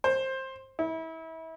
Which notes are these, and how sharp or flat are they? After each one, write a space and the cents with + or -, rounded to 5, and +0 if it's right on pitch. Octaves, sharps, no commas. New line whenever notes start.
C5 +15
E4 -30